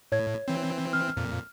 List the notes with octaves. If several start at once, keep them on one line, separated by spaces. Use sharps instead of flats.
A2 C#5 G#6
E3 C4
F6
F2 A#2